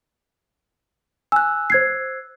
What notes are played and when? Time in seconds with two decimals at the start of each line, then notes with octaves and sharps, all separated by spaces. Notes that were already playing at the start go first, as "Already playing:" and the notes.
1.32 G#5 E6 F#6
1.70 C5 G#6 C7